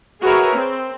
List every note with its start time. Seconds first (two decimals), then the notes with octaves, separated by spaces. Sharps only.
0.23 F#4 G#4 A#4 B4 C#5 E5
0.56 C4